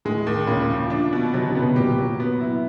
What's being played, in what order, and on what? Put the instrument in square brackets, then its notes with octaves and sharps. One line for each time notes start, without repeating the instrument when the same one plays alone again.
[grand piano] A2 [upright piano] G#3
[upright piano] D#2
[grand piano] A#2 [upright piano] C#3
[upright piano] F3
D4
B2
[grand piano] C3 [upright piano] F#3
[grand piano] C#3
[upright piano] B3
[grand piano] B2
[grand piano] A#2 [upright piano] G4
[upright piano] F#3
B3
E4